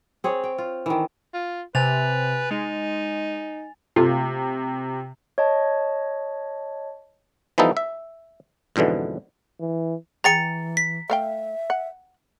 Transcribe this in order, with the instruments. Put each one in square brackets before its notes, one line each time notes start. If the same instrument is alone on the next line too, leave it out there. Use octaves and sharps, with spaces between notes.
[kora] C4 G#4 C#5
G5
F4
D#3 E3
[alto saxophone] F4
[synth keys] C3 [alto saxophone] B4 [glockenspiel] G#5 A6 F7
[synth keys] G#3 [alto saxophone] D#4
[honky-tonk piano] C3 [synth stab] A3 F4
[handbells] C#5 D#5 A5
[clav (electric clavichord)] E3 F3 G3 B3 D#4 A4
E5
F2 G#2 B2 D3 E3
[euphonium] E3
[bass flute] E3 [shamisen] G#4 G5 G#5 [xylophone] A#5 A6 C#7
[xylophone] B6
[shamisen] A3 F5 G5 [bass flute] E5
[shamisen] F#5